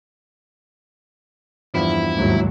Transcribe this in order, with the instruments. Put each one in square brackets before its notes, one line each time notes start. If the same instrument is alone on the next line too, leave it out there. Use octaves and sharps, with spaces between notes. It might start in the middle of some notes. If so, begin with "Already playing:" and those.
[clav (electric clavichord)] E2 G2 F3 [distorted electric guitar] E4
[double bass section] D#2 G#2 F#3